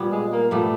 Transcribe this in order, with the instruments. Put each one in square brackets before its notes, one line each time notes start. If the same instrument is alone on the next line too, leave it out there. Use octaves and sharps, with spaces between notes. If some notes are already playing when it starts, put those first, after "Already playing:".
Already playing: [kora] A#2 G3 B3
[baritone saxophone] G#3
A#3
[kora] A#2 G3 B3 [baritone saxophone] A3